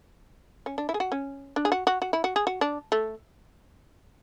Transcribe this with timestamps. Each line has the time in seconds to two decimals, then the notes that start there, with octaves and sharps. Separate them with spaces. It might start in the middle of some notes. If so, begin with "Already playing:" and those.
0.66 C#4
0.78 D4
0.89 E4
0.94 G#4
1.00 F#4
1.12 C#4
1.56 D4
1.65 G#4
1.72 F#4
1.87 F#4
2.02 F#4
2.13 E4
2.24 F#4
2.36 G#4
2.47 F#4
2.61 D4
2.92 A3